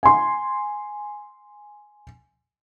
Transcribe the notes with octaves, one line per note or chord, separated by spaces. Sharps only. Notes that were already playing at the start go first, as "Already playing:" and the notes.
G#5 C6